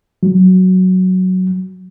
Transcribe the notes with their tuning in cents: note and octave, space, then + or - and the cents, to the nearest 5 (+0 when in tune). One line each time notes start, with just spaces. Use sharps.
F#3 +5